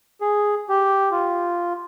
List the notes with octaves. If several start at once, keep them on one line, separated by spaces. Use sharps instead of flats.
G#4
G4
F4